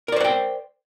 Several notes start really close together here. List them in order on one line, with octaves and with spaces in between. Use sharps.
A#4 D5 C5 F#5 G5